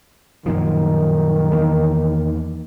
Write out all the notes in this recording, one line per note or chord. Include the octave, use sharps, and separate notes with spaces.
F#2 A#2 D#3 F3
E2 E3 A#3